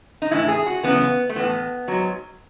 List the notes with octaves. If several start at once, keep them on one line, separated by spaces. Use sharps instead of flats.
D#4
A2 E3 E4
G#4
F#4
F#2 C#3 E3 B3
A3
A2 E3 B3
G#2 F#3